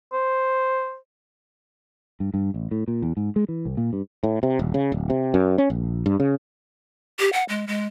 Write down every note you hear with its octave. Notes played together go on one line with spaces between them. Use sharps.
C5
G2
G2
A1
A2
A#2
E2
G#2
G#3
E3
C2
A#2
G2
A2
C3
D#1
C#3
D1
C3
F#2
C#4
A#1
G2
C#3
G4
F#5
G#3
G#3